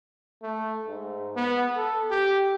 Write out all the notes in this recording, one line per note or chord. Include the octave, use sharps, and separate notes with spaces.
A3
G#2
B3
A4
G4